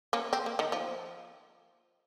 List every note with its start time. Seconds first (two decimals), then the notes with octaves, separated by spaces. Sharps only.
0.13 A#3 C#4
0.33 C4
0.46 A#3
0.59 D#3
0.72 F3